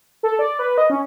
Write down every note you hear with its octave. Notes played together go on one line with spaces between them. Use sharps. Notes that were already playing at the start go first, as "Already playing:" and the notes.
A4
D5
B4
D#5
C#4